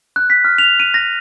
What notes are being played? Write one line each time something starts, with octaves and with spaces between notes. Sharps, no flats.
F#6
B6
F6
F7
D#7
A#6